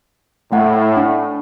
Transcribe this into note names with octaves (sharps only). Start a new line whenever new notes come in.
A2 A3 F#5
D4